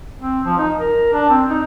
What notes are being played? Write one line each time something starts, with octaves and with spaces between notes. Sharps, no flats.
C4
F3
D#4
A#4
D4
C4
D#4